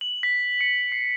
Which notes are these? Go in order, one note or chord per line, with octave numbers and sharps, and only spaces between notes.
F#7
B6
C#7
C7